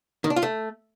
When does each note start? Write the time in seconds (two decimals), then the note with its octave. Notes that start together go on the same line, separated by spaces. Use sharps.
0.24 D#3
0.30 D4
0.36 F4
0.43 A3